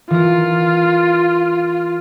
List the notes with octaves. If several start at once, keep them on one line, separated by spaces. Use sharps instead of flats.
E3 F4 A#4